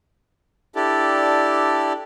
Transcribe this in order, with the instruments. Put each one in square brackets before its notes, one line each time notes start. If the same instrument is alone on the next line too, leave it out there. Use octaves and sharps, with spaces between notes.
[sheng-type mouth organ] D4 E4 G4 A4 D5